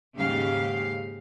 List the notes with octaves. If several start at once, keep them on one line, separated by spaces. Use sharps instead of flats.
D#2 G#2 C#3 G4 F5